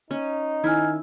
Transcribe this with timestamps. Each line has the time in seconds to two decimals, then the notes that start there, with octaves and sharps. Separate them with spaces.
0.11 C#4 D#4
0.64 D#3 E4 G#5 F6 G#6